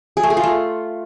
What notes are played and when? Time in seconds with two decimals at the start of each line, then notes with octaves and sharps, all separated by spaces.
0.17 G#4
0.23 A3
0.30 G#4
0.37 F4
0.44 A3